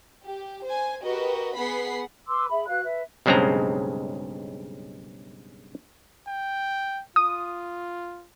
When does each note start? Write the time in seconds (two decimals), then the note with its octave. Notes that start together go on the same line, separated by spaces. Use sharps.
0.24 G4
0.66 C5 G#5
1.02 F#4 G4 A#4 B4 D#5
1.57 B3 G#4 F#5 B5 B6 C7
2.28 B4 C6 D6 E6
2.49 G#4 E5 B5
2.67 F#4 B4 F5 F#6
2.83 B4 E5
3.26 B1 G2 C#3 G#3 C4 A#5
6.28 G5
7.16 F4 D#6